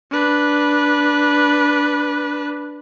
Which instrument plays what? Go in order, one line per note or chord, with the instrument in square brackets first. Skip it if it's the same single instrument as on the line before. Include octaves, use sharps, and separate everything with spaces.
[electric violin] D4 B4